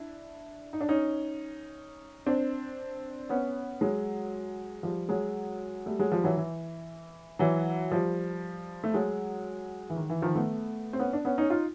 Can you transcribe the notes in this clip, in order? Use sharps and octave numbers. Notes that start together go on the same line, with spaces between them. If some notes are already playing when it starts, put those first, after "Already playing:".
Already playing: D4 E4
D#4
D4
C#4 D#4
C4 D4
B3 C#4
F#3 G#3
F3 G3
F#3 G#3
G3 A3
F#3 G#3
F3 G3
E3 F#3
E3
E3 F#3
F3 G3
A3
F#3 G#3
E3
D#3
E3
D#3 F3
A3 B3
C4
B3 C#4
D4
B3 C#4
C#4 D#4
D#4 F4